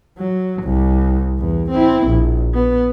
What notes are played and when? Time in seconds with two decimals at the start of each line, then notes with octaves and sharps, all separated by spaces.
0.19 F#3
0.63 C2
1.39 E2
1.70 C4 E4
2.07 A#1
2.54 B3